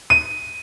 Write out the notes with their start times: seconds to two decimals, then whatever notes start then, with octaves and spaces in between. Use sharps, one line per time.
0.10 D#7